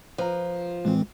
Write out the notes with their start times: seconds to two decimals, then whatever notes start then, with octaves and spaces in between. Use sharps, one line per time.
0.18 F3 B4 A#5
0.85 A2 E3 G#3 C4